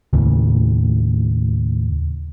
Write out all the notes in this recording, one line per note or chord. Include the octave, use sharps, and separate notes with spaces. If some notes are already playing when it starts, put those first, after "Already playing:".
D#2 A2 C#3